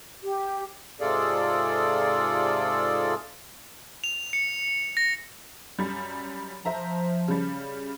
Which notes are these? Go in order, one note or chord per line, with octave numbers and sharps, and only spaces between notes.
G4
G#2 C3 F4 G#4 A4 D5
F7
C#7
A#6
F#2 G3
F3 C5 E5 A#5
C#3 G3